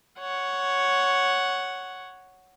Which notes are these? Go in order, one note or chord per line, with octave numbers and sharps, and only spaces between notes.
C#5 F#5